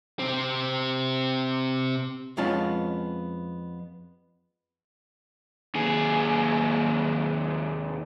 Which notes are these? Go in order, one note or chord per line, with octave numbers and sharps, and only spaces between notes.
C3 C4
F2 G#3 B3 C#4 F4 A5
D#2 G#4